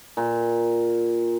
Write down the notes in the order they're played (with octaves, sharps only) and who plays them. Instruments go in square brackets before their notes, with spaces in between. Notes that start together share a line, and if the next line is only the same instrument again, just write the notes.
[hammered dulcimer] A#2